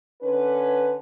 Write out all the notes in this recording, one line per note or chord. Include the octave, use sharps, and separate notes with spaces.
D3 C#4 B4